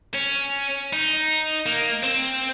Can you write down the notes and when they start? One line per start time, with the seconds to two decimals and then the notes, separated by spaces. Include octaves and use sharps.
0.15 C#4
0.93 D#4
1.66 A#3
2.03 C4